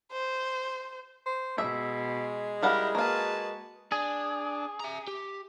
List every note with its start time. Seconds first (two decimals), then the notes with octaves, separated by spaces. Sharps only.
0.12 C5
1.26 C5
1.58 B2 G#3 E5
2.63 G3 E4 G4 A#4 F5 F#5
2.95 A#3 F#4 B4 F5 A5
3.92 D4 G#4
4.80 E5 A#5
5.08 G4